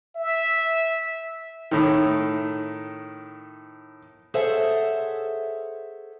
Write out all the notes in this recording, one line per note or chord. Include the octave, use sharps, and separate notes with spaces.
E5
A2 D#3
G#4 A4 C5 C#5 E5 F#5